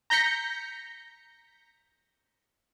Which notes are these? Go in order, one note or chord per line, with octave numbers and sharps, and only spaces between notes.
A#5 G6 A#6 B6 C#7